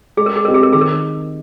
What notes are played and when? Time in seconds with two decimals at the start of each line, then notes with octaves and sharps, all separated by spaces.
0.17 G#3 G#4
0.26 A#4
0.36 G#4
0.45 C4 G4 A#4 C5 D#5
0.54 G#4
0.63 A#4
0.73 D#3 G#4
0.81 A#4